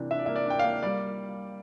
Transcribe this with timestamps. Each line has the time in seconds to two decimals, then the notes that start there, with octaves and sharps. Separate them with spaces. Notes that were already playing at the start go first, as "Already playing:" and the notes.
Already playing: C3 E3 A#3 D4
0.11 D4 E5
0.19 D5
0.26 A#3 E5
0.36 D5
0.46 D4 G5
0.59 A#3 F5
0.83 G3 D5